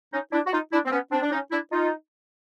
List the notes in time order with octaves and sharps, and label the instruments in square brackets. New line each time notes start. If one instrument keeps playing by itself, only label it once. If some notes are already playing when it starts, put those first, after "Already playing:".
[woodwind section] C#4 D#4
D4 E4
F#4
D#4 F4
D4 E4
C4
B3 C#4
C4 D4
D4
C#4 D#4
D4 E4
D#4 F4